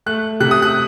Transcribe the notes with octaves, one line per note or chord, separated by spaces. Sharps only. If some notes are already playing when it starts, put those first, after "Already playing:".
A3 F#6
C3 F#6
D#6
F#6